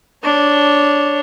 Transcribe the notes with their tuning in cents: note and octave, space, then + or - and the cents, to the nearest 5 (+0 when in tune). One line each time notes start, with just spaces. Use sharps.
D4 -5 C#5 +0